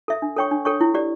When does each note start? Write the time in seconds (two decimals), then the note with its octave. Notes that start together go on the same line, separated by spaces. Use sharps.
0.08 A4 E5
0.22 D4
0.37 A4 C#5 G5 C#6
0.51 D4
0.65 A4 C#5 G5 C#6
0.81 E4
0.94 G4 D5